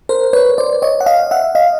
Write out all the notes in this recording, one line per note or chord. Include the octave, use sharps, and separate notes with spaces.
A#4 C5
B4 C#5
C5 D5
C#5 D#5
F#5
D#5 F5
E5 F#5
D#5 F5